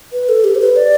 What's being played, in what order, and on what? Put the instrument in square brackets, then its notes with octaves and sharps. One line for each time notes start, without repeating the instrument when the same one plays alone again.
[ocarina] B4
A4
G4
C5
B4
D5